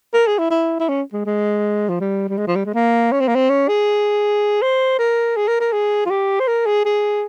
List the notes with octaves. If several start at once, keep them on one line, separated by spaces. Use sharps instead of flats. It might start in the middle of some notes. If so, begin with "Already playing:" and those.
A#4
G#4
E4
E4
E4
C#4
G#3
G#3
F3
G3
G3
G#3
F3
G3
G#3
A#3
C#4
C4
A#3
C4
C#4
G#4
C5
A#4
G#4
A#4
A#4
G#4
F4
G4
C5
A#4
G#4
G#4